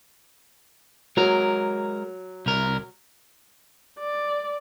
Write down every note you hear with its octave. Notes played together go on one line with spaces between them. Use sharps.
F#3 G#3 A#4
C2 A#4
D5